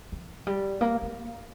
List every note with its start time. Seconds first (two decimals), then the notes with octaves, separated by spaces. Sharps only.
0.12 F3
0.47 G3
0.81 A#3
1.02 A#3